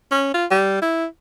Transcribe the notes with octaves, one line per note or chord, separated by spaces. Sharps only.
C#4
F4
G3
E4